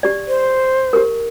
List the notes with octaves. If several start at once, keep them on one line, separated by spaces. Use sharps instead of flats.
G4 D5
C5
G4 A#4